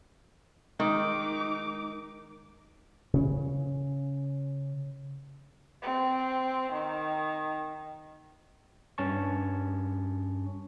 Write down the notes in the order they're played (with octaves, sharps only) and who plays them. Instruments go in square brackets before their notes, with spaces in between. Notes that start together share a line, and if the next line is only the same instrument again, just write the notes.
[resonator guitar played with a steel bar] D#3 [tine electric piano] G#3 [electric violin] D#4 D6
[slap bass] C#3 C#4
[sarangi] C4
D#3
[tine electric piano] G2 C#4 A5 C#6